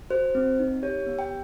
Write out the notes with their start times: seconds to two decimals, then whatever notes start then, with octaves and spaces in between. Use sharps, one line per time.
0.10 F#4 C5
0.35 C4
0.59 D#4
0.83 G4 C#5
1.06 B3
1.19 G5